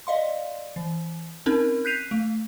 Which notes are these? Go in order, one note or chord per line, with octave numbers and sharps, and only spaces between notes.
D5 D#5 F5 C6
E3
C4 C#4 D#4 A#4
F#6 G6 B6 C7 D#7 F7
A3